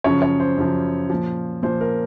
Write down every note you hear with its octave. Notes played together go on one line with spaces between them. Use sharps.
F#2 C#3 F3 C#5
C#5
C5
F#2 C#3 F3
A#2 F3
A#2 F3 C5
A#4